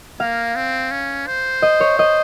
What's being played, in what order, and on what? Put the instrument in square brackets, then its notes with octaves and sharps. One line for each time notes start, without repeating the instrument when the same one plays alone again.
[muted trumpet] A#3 [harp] F5
[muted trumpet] C4
C#4
C5
[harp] D#5
C#5
D#5